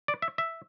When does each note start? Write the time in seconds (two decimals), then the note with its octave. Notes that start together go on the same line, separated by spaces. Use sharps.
0.08 D5
0.22 E5
0.38 E5